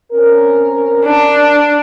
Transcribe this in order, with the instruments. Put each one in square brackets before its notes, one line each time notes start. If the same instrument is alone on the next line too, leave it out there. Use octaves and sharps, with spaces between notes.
[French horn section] C4 C#4 A#4
[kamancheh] D4